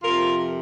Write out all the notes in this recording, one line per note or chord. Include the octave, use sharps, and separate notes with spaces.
F2 C3 F3 F4 A#4